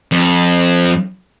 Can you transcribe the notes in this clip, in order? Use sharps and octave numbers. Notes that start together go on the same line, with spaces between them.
F2